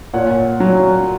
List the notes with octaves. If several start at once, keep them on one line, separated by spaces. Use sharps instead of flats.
A#2 C#5 F#5
F#3